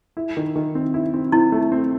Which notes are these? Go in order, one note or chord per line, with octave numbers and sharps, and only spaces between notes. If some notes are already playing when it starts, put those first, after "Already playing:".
E4
D#3
D#3
C4
E4
C4
C4 E4
A3
C4